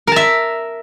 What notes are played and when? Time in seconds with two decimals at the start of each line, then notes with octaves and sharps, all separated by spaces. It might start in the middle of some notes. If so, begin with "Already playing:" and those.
0.07 A#4
0.12 A5
0.16 E5